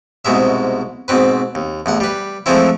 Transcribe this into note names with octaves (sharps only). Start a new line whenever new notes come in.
C2 G#2 B2 G#3 E5
G#2 B2 C4 B4
D#2
A1 E2 F#5
G3 B4
E3 F3 G#3 A3 C4 E4